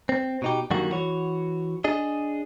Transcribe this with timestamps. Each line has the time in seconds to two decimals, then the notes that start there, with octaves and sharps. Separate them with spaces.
0.09 C4
0.42 B2 D#4 G4
0.70 F#2 D3 D#3 G3 A#3 F#4
0.91 E3 F#4 C#5
1.84 D4 G#4 D#5